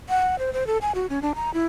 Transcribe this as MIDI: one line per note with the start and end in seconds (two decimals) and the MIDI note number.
0.09 0.39 78
0.39 0.53 72
0.53 0.67 72
0.67 0.78 69
0.81 0.95 80
0.95 1.06 66
1.10 1.22 61
1.22 1.33 62
1.35 1.53 82
1.54 1.66 64